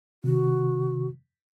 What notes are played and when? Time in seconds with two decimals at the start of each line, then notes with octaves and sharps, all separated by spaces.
0.24 C3 D#3 F#4